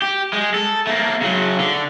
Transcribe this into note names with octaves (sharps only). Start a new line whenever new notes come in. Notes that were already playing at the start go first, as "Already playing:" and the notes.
G4
G#3
A4
A3 A#3
C#3 F#3
D3